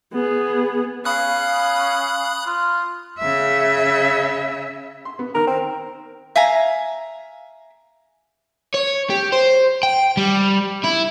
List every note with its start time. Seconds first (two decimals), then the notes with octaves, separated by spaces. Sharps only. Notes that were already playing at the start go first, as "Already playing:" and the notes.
0.13 B3 G#4
1.05 C#4 F5 B5 D#6 F#6
2.46 F4
3.19 C#3 E5
5.05 C6
5.19 B3
5.35 D#3 A#4 F6
5.48 C4
6.36 E5 F5 G#5 A#5
8.74 C#5
9.10 G4
9.32 C5
9.83 G5
10.17 G3
10.84 E4